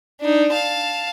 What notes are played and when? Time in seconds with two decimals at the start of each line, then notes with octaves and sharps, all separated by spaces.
0.21 D4 D#4
0.53 F5 A5